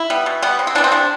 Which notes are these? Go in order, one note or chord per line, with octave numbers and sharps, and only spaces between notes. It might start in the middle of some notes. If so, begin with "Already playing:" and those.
Already playing: E4
G3 B3
B2
G3 B3
C3
C4
E3 B3 D4
C4
C3 D4